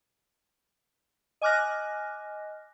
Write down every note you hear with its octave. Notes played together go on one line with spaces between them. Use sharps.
D#5 G#5 D6 F6 F#6 A#6